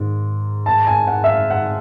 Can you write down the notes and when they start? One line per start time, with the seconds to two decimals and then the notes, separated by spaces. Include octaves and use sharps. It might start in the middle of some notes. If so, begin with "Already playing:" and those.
Already playing: G#2 D#3
0.66 A5
0.87 G#5
1.07 F#5
1.24 E5
1.28 F5
1.50 F#5